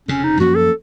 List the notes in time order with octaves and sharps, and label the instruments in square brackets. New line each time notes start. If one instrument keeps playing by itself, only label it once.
[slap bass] F1 F2 C#3 [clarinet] C#4
[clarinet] D#4
[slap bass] F#2 F3 A#3 C#4 [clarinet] F#4
[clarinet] A4